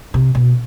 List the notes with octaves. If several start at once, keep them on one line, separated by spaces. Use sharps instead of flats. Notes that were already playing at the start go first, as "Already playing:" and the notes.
C3
B2